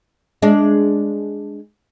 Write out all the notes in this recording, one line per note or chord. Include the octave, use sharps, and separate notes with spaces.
G#3 D4